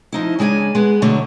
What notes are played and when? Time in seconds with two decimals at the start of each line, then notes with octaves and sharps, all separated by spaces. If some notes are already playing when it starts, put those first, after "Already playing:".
0.12 F3 D#4 E4
0.39 C#3 G#3 D4 G#5
0.75 G#3 B3
1.02 B2 D3 F#3 A3